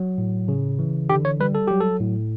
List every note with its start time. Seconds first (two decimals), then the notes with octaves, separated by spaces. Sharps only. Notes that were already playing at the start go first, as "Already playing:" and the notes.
Already playing: F#3
0.18 A2
0.48 C#3
0.79 E3
1.10 D3 G4
1.25 C#5
1.40 G3 B4
1.55 A4
1.67 F#3 G4
1.80 A4
2.00 A2